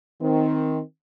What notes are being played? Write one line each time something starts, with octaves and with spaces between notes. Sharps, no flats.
D#3 C4